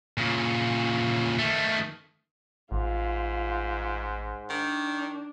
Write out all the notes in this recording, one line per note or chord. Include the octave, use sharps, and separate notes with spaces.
A#2 C#3
D#3 A3
A1 G#2 F4
D#3 D4